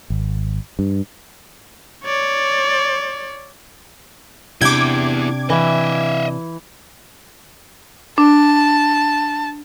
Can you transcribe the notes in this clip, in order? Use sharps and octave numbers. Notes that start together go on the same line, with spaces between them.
G#1
G2
C#5 D5
C3 B3 D4 E4 G5 D6 G#6
E3 D#5 E5
D4 A5